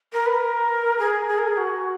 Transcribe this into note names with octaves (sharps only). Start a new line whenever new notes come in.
A#4
B4
A#4
G#4
G#4
A#4
G#4
F#4